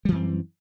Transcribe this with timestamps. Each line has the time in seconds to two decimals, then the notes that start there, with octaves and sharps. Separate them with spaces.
0.05 G3
0.09 E3
0.12 F#2
0.15 C4